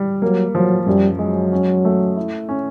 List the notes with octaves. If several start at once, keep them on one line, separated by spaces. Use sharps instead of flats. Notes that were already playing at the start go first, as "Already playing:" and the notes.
Already playing: G3
F#3 A#3
F3 F#3
F#2 G3
F#3 G#3
C#4
A3
E4
C#4